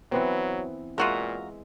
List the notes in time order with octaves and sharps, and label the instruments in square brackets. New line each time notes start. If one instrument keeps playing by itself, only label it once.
[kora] E3 B3 C4 [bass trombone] F#3
[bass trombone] A#2 [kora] G#3 E5 [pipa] F4 F#4 A#4